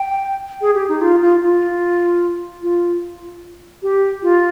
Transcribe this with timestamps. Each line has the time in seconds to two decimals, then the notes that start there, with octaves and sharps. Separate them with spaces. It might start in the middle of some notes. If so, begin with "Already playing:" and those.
Already playing: G5
0.61 G#4
0.75 G4
0.89 D#4
1.01 F4
1.22 F4
1.42 F4
2.63 F4
3.83 G4
4.23 F4